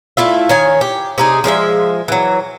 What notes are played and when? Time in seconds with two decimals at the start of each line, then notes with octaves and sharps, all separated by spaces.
0.17 A3 E4 F4 E5
0.49 D#3 C#5 G#5
0.81 G4
1.18 C3 D#4 G#4
1.44 F3 G#3 D4 E5
2.08 E3 F#3